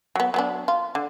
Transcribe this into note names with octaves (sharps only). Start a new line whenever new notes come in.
F#3 B3
F#3 B3 D4
F4
D3